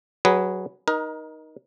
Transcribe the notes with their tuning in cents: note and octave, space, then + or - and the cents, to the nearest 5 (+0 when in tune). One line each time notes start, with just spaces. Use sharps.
F#3 +15 G#4 +0 B4 +0
D#4 +0 A#4 +30